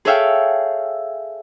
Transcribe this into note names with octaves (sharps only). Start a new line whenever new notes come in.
G#4 A4 C#5 E5 F5 G5